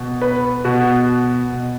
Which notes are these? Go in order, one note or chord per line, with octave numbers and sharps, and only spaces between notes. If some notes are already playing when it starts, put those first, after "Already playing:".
Already playing: B2
B4
B2 F#4
B2